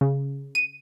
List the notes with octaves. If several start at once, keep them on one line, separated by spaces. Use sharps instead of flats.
C#3
D#7